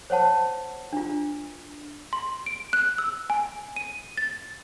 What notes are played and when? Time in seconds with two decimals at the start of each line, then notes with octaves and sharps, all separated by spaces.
0.10 C5 C#5 F#5 A5
0.93 D4 F4
2.13 C6
2.46 D7
2.73 F#6
2.98 E6
3.30 G#5
3.76 D#7
4.17 A6